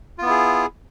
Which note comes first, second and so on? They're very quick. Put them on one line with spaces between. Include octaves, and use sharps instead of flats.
F4 B3 E4 G#4